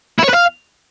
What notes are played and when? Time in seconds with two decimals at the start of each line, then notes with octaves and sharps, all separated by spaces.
0.19 E4
0.24 C#5
0.29 B4
0.34 F5